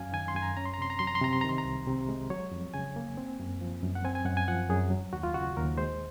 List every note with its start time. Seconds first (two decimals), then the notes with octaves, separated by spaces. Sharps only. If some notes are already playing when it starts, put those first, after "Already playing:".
Already playing: F#2 F#3 C#4 F5 G#5
0.13 D#3 G#5
0.28 C6
0.35 F#2 G#5
0.42 A#5
0.57 C#4 A#5
0.66 C6
0.74 A#5
0.79 C3 C6
0.90 A#5
0.99 F#3 C6
1.07 A#5
1.15 C6
1.22 C3 A#5
1.33 C6
1.41 D#3 A#5
1.49 C6
1.58 A#5
1.65 C2
1.87 C3
2.09 G#3
2.30 F#3 C#5
2.51 F2
2.74 C#3 G#5
2.96 A#3
3.17 C4
3.40 F#2
3.61 F3
3.82 F#2
3.95 F#5
4.04 C4 G#5
4.15 G#5
4.25 F#2 F#5
4.37 G#5
4.48 F3 F#5
4.69 F#2 G#4
4.90 F#3
5.13 D#2 F#4
5.23 F4
5.34 C#3 F#4
5.57 D#2 A#4
5.77 G#3 C5